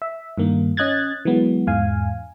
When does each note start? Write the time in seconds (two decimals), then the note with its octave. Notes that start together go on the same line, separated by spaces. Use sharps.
0.02 E5
0.38 G2 D#3 A#3
0.77 C#4 D#5 F#6 G#6 A6
1.25 E3 F#3 G#3 B3
1.67 E2 G#2 F5 G#5